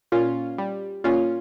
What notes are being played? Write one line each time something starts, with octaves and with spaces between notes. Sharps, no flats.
A#2 C#4 F4
G3
A#2 C#4 F4